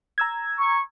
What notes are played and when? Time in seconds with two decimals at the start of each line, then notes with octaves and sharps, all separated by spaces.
0.18 A#5 E6 G#6
0.57 C#6